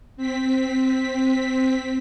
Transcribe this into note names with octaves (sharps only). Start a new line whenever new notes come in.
C4 B6